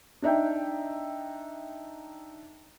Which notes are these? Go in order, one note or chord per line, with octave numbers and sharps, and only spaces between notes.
D4 D#4 E5 G5